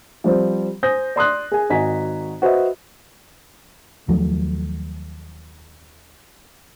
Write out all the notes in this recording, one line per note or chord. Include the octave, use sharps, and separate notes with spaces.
F3 G3 C4
C5 G#5 D#6 G6 A#6
D5 C6 D#6 F#6
G#4 G#5
G#1 F#4 D#5 G#5 A#5 B6
F#4 B4 C5 D#5 E5
D#2 F3 F#3 A3